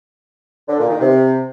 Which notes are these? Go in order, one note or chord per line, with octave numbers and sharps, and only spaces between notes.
D3
A#2
D#3
C3